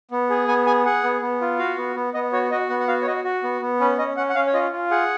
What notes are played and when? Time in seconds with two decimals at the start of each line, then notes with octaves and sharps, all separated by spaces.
0.11 B3
0.30 G#4
0.48 B3 G#5
0.66 G#4 G#5
0.85 G#4 F#5
1.03 B3
1.22 B3
1.41 F4
1.59 F#4 F5
1.77 B3
1.96 B3
2.14 B3 D#5
2.33 F#4 C#5
2.51 F#4 D#5
2.69 B3 F#5
2.80 F#5
2.88 F#4 F5
3.02 C#5
3.07 F#4 D#5
3.24 F#4
3.43 B3
3.61 B3
3.80 C#4 B4
3.98 C#4 D#5
4.17 C#4 F#5
4.29 F#5
4.35 C#4 F5
4.47 C#5
4.54 F4 D#5
4.72 F4
4.91 G#4 F#5